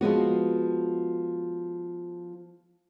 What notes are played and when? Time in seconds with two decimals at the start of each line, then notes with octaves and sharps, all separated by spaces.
0.01 F3 G#3 B3 F#4